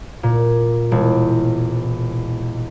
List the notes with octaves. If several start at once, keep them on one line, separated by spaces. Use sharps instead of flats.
A#2
E1